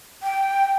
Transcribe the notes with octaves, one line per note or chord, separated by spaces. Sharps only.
G5